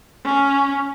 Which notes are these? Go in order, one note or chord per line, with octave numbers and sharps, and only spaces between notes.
C#4